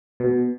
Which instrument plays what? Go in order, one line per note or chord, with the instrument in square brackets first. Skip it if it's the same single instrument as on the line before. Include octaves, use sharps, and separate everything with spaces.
[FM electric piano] B2